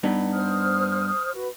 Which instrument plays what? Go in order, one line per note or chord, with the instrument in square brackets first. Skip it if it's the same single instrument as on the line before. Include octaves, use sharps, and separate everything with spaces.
[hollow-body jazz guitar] G2 B3 D#4
[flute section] C5 D#6 F6
F#4 B4